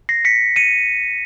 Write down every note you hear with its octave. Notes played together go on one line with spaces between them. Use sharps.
A#6 C7
B6 C#7
C#7 D#7